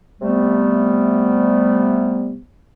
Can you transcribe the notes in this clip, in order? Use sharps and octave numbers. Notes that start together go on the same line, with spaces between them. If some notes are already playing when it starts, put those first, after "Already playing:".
C3 G3 A3 B3